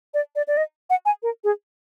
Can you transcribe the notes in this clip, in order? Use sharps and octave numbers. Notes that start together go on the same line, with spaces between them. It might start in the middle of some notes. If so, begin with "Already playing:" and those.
D5
D5
D5
D#5
F#5
G#5
A#4
G#4